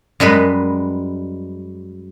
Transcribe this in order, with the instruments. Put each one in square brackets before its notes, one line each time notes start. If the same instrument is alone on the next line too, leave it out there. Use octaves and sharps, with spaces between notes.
[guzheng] F#2 G3 G#3 B4